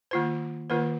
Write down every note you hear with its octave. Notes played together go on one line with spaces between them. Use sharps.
D#3 A#3 F4 C5
D#3 A#3 F4 C5